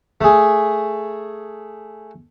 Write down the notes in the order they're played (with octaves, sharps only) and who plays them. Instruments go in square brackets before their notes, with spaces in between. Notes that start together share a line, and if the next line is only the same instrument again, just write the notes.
[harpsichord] A3 G#4